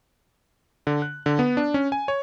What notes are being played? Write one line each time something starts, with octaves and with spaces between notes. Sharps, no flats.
D3
F#6
D3
B3
D4
C#4
G#5
C#5